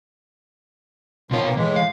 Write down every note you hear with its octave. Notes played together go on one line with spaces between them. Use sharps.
B2 D#3 F3 F4 C#5
E3 A#3
A2 E3 G#3
F5